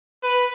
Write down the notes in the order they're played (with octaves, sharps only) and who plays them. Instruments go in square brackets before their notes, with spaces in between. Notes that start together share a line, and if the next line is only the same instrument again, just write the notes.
[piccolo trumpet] B4